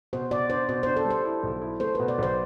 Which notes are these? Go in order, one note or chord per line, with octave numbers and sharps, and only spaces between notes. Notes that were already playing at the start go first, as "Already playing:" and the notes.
B2 C5
B2 D5
D4 C5
B2 C5
D4 C5
A4
G3 C5
E4
B1
E4
A3 C5
B2 B4
D5
B1 C5